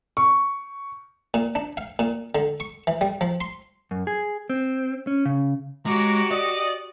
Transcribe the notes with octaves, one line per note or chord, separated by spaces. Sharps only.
C#6
A#2
D4
F5
A#2
D3
C#6
E3
G3
F3
C6
F#2
G#4
C4
C#4
C#3
G#3 F#4 G4 C#5 A#5 D6
D5 D#5 D#6